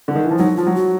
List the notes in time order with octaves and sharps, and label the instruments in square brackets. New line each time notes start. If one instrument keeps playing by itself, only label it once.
[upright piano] D3
D#3
E3
F3
[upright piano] F#3 [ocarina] D#4
[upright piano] F3 [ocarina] F4
[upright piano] F#3
[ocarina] F#4